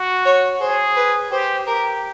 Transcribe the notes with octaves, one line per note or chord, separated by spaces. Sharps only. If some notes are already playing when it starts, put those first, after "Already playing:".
Already playing: F#4
C#5
G#4 C5
B4
G4 C5
G4 A#4